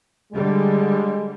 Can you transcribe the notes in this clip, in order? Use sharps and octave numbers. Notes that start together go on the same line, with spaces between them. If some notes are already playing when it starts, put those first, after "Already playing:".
D3 G3 G#3